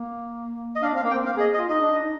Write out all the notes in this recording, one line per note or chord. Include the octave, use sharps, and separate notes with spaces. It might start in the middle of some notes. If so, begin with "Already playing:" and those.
Already playing: A#3
D#5
D4 F5
C4 F5
A#3
G5
C4
A#3 F5
G#4 D#5
D#5
F4
D#4 D#5
D4
D4
D#4